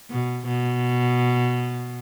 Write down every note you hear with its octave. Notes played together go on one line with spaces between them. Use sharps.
B2
B2